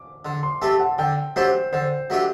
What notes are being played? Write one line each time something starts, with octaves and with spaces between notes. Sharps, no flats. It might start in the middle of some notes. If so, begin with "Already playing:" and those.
Already playing: D6
D3 C6
C6
A3 C4 G4 A5
F#5
D3 G5
F#3 A3 D4 G4 C5
D3 C5
F#3 A3 D4 G4